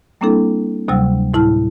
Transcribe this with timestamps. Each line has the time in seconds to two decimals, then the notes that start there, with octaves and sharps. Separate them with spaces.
0.21 G3 A#3 C4 D4 E4 A4
0.88 D2 C3 F#3 G3 E6
1.34 A2 E4 A5 F6